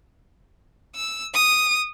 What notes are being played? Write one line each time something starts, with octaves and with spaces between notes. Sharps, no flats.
E6
D#6